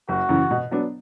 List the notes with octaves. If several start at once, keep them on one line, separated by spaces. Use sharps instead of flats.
F#1 F#4
F#2 C#3 E3
B2
F#3 B3 D4